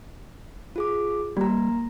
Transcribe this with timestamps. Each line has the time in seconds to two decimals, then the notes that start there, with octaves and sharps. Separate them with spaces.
0.76 F4 G#4 D6
1.37 G3 A#3 A#5